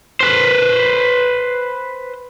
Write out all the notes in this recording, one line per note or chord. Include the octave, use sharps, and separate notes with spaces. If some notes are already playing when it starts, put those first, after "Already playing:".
B4 C5